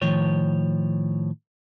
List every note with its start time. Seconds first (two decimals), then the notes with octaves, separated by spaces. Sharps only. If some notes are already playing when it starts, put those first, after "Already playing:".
0.02 A2 D#3 F3 C#5